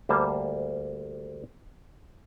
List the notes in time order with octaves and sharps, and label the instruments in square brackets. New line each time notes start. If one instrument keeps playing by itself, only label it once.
[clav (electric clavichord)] D2 G3 A#3 C5 A5